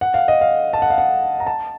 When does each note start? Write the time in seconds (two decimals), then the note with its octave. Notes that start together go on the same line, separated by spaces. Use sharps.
0.01 F#5
0.14 F5
0.28 D#5
0.41 F5
0.73 A5
0.82 F#5
0.90 F5
0.98 F#5
1.40 A#5
1.47 A5